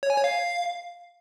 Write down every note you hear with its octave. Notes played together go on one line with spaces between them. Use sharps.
C#5
G#5
C#5
F5